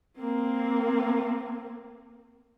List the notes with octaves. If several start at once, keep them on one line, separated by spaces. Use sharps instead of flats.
A#3 C4